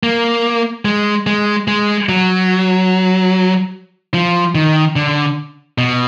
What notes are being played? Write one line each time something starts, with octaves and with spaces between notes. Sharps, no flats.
A#3
G#3
G#3
G#3
F#3
F3
D#3
D3
B2